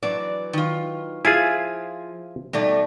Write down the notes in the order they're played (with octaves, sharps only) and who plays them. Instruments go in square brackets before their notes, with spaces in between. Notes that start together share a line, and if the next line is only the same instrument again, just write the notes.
[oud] E3 F#3 D4 [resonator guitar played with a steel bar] D5
[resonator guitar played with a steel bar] D#3 F4
[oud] F3 [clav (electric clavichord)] E4 F4 G#4 [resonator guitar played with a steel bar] G#5
[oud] B2 D#4 D5 [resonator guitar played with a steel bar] G3 A3